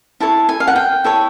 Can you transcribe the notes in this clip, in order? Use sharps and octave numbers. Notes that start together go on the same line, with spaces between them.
E4 A4 C#5 A5
G#5
F5
F#5
G5
E4 A4 C#5